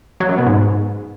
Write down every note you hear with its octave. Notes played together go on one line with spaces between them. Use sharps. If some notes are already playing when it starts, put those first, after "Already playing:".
F#3
F#2
B2
G#2